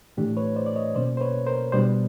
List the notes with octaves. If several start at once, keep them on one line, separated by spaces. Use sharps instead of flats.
A2 E3 A3 D4 G4
B4 C#5
C5 D5
D5
C#5 D#5
B2 F#3 A#3 C#4 C5 D5
C5
B4 C#5
A#4 C5
B2 G3 B3 D4 C5 D5